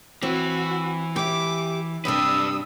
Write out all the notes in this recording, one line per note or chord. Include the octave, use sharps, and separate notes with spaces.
E3 C4 F#4
G4 E5 D6
G2 C3 D4 G4 B4 D#6 E6